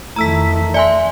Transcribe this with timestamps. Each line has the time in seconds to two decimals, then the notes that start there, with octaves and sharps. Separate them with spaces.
0.16 F2 D#3 A3 E4 A#5 E6 B6
0.74 D5 E5 G#5 C6